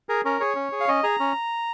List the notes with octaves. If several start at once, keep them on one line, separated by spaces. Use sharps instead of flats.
G#4 A#4
C#4 A#4
G#4 C#5
C#4
G#4
F5
C#4 D#5
G#4 A#5
C#4